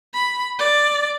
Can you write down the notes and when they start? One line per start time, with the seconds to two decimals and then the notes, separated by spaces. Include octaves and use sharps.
0.14 B5
0.59 D5